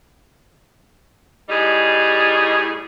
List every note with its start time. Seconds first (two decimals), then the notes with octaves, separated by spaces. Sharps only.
1.49 A2 G3 D#4 G#4